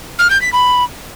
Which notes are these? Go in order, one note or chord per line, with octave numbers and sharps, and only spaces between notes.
F6
G6
B6
B5